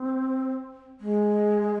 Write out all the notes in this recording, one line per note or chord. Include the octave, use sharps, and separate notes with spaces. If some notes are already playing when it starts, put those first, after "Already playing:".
Already playing: C4
G#3